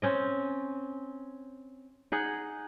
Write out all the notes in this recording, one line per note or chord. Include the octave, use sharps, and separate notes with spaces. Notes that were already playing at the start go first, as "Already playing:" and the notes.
C4 C#4 D#5
D#4 G#4 F#5